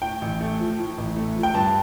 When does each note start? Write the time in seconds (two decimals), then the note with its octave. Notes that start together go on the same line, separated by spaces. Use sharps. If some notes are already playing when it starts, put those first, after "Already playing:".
0.02 A2 G5
0.21 A1
0.41 A3
0.59 F3
0.79 A2
0.98 A1
1.16 A3
1.36 F3
1.43 G5
1.54 G2 A5